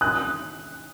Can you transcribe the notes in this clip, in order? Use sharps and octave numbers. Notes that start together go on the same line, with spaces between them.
D#6 F#6